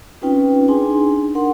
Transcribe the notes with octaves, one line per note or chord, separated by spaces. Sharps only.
C4 C#4 D#4 F4 B4 G5
D4 D#4 G#4 G#5 C6
D4 A#4 F#5 C6